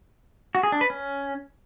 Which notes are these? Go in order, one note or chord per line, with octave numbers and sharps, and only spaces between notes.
F#4
G#4
D4
B4
C#4